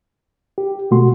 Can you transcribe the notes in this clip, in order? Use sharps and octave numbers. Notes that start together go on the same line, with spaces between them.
G4
B2 A3 F#4 C6